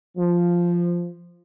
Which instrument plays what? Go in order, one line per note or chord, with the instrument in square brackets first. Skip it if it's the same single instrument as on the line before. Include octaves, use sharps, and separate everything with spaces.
[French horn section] F3